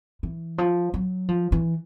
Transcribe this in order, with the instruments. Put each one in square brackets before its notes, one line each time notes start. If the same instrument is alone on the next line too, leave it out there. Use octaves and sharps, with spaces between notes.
[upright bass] E3
F3
F#3
F3
E3